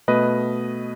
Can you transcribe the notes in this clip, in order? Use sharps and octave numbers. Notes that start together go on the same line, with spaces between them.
B2 A3 B4 D#5